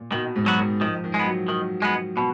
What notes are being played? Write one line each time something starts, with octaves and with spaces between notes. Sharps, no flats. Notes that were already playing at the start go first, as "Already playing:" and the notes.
Already playing: A#2
B2 D#3
G#2
F#3 B3 F#4
D#3
D#3 F3
D#3
G#3
B3
F#3
D#3
G#3 B3
B2